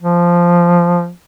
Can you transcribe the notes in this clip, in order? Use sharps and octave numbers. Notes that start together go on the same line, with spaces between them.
F3